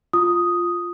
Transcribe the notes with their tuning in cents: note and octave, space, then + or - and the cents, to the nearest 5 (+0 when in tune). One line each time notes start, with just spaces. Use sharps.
F4 +0 D#6 +0